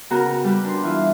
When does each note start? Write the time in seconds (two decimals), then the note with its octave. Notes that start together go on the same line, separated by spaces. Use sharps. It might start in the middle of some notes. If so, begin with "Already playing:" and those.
0.10 C#3 B3 F#4 A#4 G5 A#5
0.44 G3 G4 B4
0.65 D4 C6
0.83 E3 F4 E5